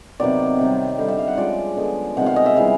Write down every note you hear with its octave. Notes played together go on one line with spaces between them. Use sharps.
C3 D#3 F#3 B3 D5
C3 D#3 G3
D3 G3 C4 D#4
E5
F5
F#5
F3 G#3 C#4 D5
D3 F3 G#3 B3
C3 D#3 G#3 B3 F#5
F5
D#5
E5
C#3 E3 G3 F5